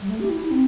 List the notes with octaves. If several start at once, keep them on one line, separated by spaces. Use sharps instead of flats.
G3
A3
G4
E4
E4
C4